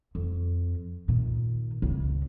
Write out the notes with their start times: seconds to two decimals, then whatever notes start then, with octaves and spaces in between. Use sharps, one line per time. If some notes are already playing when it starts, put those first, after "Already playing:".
0.15 F2
1.08 A#2 D#3
1.82 C#2 C#3